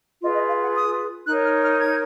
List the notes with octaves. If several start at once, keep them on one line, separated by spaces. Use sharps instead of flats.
F4 G#4 B4 D#5
D#5
F5
F#5
D#6
D#4 A#4 C#5 F#6
F6
F6
G#6